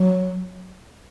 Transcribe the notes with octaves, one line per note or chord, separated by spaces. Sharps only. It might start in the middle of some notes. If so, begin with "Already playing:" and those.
Already playing: F#3